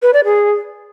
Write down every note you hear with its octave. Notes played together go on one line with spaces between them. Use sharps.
B4
D5
G#4